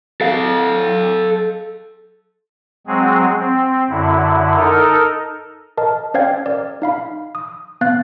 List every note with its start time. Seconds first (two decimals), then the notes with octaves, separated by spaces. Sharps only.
0.21 A4 F5
2.87 F#3 G#3 C4 G#4
3.39 C4
3.90 F#2 D3 E4
4.56 D#4 A4 A#4
5.77 A#4 D#5 A5
6.14 C#4 C5 D5 F5 G5 G#6
6.46 A#4 D5
6.82 D#4 F5 B5
7.35 D#6
7.81 B3 F5 F#6 A6